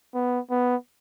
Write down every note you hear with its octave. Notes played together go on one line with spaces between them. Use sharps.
B3
B3